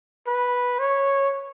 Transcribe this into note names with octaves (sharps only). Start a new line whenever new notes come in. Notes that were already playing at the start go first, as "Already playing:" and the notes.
B4
C#5